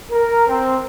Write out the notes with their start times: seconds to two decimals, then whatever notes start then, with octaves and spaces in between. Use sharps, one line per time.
0.11 A#4
0.48 C4